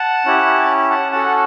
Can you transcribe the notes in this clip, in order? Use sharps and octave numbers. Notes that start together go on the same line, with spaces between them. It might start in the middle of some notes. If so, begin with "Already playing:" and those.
Already playing: F#5 A5
C#4 E4 G4
F#5 A5
C#4 F#4 A4 F#5 A5